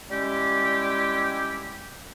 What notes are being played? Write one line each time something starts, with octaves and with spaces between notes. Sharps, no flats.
G3 G#3 C#4 E4 G4